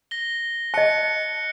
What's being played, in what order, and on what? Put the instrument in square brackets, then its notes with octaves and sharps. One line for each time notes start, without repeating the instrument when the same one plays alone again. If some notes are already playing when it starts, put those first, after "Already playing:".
[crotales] A#6 G7
[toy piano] D#5 A5 [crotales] F#6 C#7